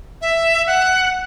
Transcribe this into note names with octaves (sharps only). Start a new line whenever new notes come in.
E5
F#5